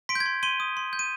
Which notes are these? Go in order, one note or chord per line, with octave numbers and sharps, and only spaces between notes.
C6 B6 D7
G6
G#6
C6
C6 D#7 G7
D#6
C6
G6
D#7